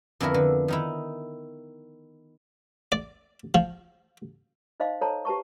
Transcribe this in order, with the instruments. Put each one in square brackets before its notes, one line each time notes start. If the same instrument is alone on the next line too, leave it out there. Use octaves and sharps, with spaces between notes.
[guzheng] F2 D3 B3 E4 A#4
D3
D#3 D#4 E4
[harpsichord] D5
F3
[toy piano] D#4 C5 D#5 F5 C6
A4 C5 C#5 A5 A#5
G4 B4 A5 C#6